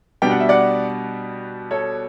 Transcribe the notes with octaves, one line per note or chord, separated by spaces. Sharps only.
B2 G3 B3 D4 G5
F#5
E5
D5 F#5
A4 C#5